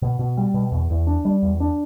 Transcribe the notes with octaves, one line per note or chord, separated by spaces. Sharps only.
B2
B2
G3
B2
E2
E2
D4
G3
E2
D4